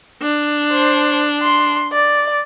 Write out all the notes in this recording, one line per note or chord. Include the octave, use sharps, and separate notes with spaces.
D4
C5
C6
D5